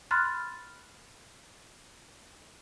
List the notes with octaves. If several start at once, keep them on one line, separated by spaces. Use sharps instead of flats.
B5 C6 F6 F#6 A6